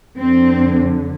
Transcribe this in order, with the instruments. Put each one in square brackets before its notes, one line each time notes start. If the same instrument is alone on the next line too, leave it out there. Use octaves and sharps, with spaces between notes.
[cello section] F2 D3 C4